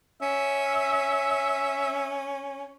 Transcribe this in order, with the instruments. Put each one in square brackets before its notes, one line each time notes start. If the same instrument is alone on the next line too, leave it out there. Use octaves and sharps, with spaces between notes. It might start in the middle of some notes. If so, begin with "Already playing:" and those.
[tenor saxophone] C#4 [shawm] E5